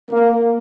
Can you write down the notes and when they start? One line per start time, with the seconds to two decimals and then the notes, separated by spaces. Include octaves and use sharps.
0.11 A#3